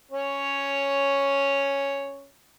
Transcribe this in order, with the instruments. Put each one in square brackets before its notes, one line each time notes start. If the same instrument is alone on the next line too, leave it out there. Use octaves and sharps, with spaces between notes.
[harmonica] C#4 C#5